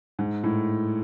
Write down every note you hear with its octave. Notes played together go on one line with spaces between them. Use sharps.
G#2
A2